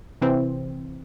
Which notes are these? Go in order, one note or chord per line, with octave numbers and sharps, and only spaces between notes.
C3 E3 C4